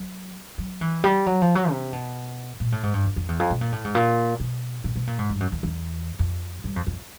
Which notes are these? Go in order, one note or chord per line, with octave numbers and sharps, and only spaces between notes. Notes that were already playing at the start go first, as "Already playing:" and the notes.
Already playing: F#3
F#3
E3
G3
F#3
F3
F#3
C3
B2
A#2
A2
G#2
G2
F2
F2
E2
F2
B2
A#2
A2
G#2
A#2
B2
A#2
B2
A#2
G#2
G2
F#2
E2
E2
F2
G2
F2
F2